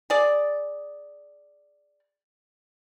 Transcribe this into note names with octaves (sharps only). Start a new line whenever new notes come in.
G#4 D5